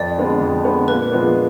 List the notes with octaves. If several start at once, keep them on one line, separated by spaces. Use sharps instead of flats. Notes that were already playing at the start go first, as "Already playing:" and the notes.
Already playing: F2 D5
D3 G#3 B3
F2
D3 G#3 B3
A#2 B4
F3 G#3 B3 D4